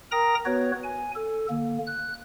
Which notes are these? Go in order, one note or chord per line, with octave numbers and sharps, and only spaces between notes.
A#4 G5 A#5 D#6 A#6
B3 F#4 B4 C#5
G#5
A4
D3 A#3
F#6